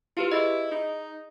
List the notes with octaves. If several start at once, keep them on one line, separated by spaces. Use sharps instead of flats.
E4 F4 G4 B4
E4 G#4 D#5
D#4